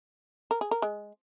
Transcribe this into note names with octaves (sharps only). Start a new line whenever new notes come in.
A#4
G#4
A#4
G#3